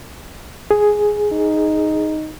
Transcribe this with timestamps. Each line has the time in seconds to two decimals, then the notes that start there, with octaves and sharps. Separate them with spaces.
0.71 G#4
1.33 D#4